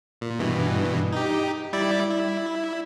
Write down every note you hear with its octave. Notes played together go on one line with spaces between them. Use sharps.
A#2
G2 B2 E3
D#4 G4
G3 E4 D5
E4